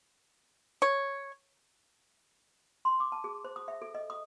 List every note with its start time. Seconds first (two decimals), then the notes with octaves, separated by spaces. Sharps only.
0.82 C#5
2.85 C6
3.00 D6
3.12 A5
3.24 G#4
3.44 C5
3.56 D#6
3.68 E5
3.82 A4
3.95 D#5
4.10 D#6